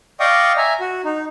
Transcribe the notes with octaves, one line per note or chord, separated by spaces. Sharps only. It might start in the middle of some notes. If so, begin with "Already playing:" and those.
D5 D#5 F5 G5 C#6 D#6
E5 G#5 A#5
F#4
D#4